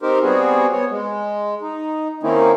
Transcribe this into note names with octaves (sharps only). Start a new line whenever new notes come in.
C4 D#4 G4 A#4 C5
G3 B3 C4 F#4 G#4
B3 C#5
G#3
D#4
D#3 A#3 C4 C#4 D#4 E4